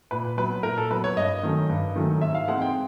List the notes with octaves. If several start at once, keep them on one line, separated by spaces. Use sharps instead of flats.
A#2 B4
F#3 B3 B4
A#2 A#4
A4
F#3 B3 B4
C#5
G2 D#5
D#3 F#3 A3 C#4
G2
D#3 F#3 A3 C#4
G#2 E5
F5
E3 G#3 C4 D#4 F#5
G5